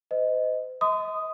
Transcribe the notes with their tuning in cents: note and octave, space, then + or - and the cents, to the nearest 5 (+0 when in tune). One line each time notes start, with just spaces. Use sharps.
C5 -40 D#5 +0
D#5 +40 C6 -35 D#6 +0